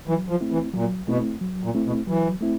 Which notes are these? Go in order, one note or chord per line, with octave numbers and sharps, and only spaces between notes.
E3 F#3
F3
A3 C4 E4
E3
A#2 F#3
B2 A3 C4 E4
F#3
A#2
A3 C4 E4
B2
E3 F#3
A3 C4 E4